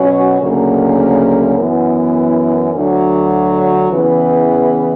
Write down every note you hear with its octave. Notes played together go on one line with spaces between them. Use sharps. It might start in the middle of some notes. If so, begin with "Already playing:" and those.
Already playing: B2 F#3 C#4 F#4
D2 C#3 F#3 A#3
F#2 E3 B3 E4
D2 D3 F#3
E2 C#3 E3 B3